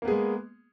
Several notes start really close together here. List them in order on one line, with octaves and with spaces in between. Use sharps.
A#3 B3 G#4 G#3